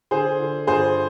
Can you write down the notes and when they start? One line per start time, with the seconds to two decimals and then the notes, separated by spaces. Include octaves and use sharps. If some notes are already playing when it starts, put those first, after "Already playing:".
0.11 D3 G#4 C5
0.40 D3
0.67 G2 G#4 C5